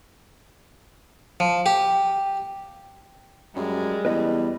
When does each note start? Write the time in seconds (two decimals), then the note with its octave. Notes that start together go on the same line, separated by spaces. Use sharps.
1.40 F3
1.66 G4
3.56 F#2 G3 G#3
4.05 E2 B4 D#5